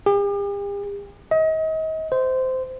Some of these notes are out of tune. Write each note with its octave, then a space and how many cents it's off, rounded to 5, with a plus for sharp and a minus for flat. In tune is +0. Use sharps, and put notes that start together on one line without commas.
G4 +45
D#5 +35
C5 -15